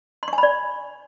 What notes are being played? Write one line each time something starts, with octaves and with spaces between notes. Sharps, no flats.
C6
C#6
G#5
B5
D5